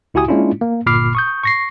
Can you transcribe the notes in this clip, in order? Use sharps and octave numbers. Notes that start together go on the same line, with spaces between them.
C#2 E4 F#4 G4 G#5 D#6
G#3 A#3 C#4 D4 E4 F4
A#3
G1 A#2 B5 D6 F6 C7
C#6 D#6 G6
C#6 A#6 C7